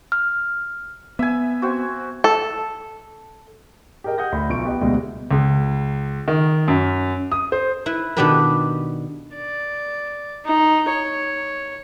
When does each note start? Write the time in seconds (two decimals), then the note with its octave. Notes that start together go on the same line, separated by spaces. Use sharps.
0.12 F6
1.19 B3 E5 G#5
1.62 C4 F#4
2.24 A4
4.04 G4 G#4 A#4 D#5 G5
4.18 F#5 D#6 G6 A#6
4.32 D2 B5
4.49 B1 F3 C#6 D7
4.65 B3 G4 D#5
4.81 D2 B2 G3 G#3 B3
5.31 C#2
6.28 D#3
6.68 F#2
7.32 D#6
7.52 C5
7.86 E4 B4
8.17 B2 D#3 D4 G4 A4 B4
9.35 D5
10.45 D#4
10.89 C#5